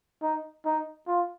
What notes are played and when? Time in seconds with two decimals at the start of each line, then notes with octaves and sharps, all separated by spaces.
0.22 D#4
0.65 D#4
1.07 F4